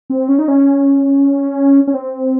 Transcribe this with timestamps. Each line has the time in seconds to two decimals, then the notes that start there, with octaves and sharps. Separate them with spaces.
0.10 C4
0.29 C#4
0.39 D#4
0.48 C#4
1.87 C#4
1.94 C4